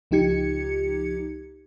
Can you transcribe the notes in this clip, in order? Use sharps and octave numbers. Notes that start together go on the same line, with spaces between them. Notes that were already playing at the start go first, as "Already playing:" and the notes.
C#2 F3 D#4 G4 G#6 C#7